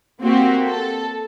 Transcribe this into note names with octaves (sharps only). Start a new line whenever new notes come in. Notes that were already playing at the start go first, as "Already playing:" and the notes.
A#3 C4 F#4 G4
A4